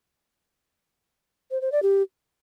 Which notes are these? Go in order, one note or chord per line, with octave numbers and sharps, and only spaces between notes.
C5
C5
D5
G4